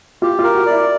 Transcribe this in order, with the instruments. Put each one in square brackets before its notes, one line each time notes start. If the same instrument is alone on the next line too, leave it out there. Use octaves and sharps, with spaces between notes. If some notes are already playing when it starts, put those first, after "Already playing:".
[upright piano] F4 [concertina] G4
[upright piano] F4
[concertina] A#4
[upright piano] F#4
[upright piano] E4 [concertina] D5